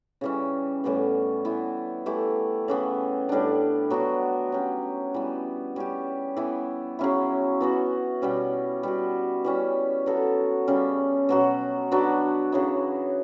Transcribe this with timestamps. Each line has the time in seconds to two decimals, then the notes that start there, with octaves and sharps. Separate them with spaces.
0.21 C#3 E3 G3 C#4
0.84 A2 E3 G3 B3
1.45 E3 B3 E4
2.06 E3 A3 E4 G4
2.68 C#3 E3 B3
3.29 A2 G3 D4
3.90 F#3 B3 D4 F#4
4.52 F#3 C#4 G4
5.14 E3 G3 B3
5.76 G3 C#4 G4
6.37 E3 B3 E4
6.99 C#3 F#3 C#4 E4
7.61 E3 B3 F#4
8.22 B2 G3 C#4
8.83 G3 B3 F#4
9.44 E3 G3 C#4
10.06 F#3 B3 F#4 A4
10.68 C#3 G3 C#4
11.29 B2 F#3 B3 F#4
11.91 F#3 B3 D4 F#4
12.52 C#3 F#3 B3 E4